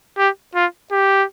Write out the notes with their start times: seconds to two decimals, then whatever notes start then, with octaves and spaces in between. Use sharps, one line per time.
0.18 G4
0.55 F4
0.92 G4